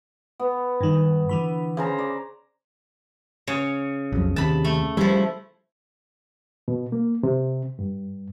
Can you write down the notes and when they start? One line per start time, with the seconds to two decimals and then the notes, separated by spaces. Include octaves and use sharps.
0.39 B3
0.81 G2 D#3
1.29 D3 E3 B5
1.77 C#3 C5 A#5
1.98 D5
3.47 C#3 C#5
4.12 B1 F2
4.36 D#2 C3 A5 B5
4.65 A3
4.97 F3 G3 E4
6.68 B2
6.92 A#3
7.23 C3
7.79 G2